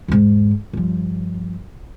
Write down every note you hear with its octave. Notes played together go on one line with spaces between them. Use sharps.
E2 G#2
G2 F3